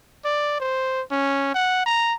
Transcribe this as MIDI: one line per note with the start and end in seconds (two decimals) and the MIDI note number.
0.25 0.60 74
0.60 1.02 72
1.11 1.50 61
1.54 1.82 78
1.86 2.14 82